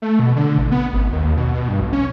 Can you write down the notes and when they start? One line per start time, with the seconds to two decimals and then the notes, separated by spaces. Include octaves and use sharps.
0.02 A3
0.19 B2
0.36 D3
0.58 A1
0.71 B3
0.93 G#1
1.12 D#2
1.37 B2
1.54 B2
1.68 G2
1.81 B1
1.93 C#4